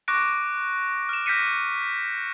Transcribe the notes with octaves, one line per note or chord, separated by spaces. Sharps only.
C#6 D6 F#6 A#6 D7
F6 E7
F6 G6 A#6 B6 C#7 D#7